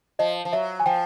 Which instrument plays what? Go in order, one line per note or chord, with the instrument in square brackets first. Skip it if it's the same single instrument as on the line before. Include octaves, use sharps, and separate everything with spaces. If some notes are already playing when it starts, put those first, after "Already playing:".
[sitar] F3 [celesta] D#5
[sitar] F3
[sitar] F#3 [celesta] E5
[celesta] G#5
[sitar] F3 [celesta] G5